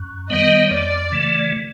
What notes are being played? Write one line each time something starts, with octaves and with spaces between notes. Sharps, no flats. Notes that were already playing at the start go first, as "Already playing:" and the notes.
Already playing: F#2
D#3 G3 B3 D#5
F2 D5
C#3 E3 A3